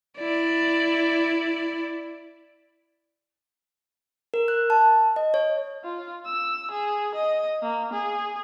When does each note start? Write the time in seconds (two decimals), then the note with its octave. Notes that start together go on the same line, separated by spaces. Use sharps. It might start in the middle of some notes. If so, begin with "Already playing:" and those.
0.18 E4 D5
4.34 A#4
4.48 F#6
4.70 A5
5.16 D#5
5.34 C#5
5.84 F4
6.26 E6
6.71 G#4
7.15 D#5
7.62 A#3
7.93 G#4